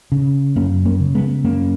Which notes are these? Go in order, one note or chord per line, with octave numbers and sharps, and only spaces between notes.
C#3
F#2 A#3 C#4
A#3 C#4
C#3
G#3 B3
F#2 A#3 C#4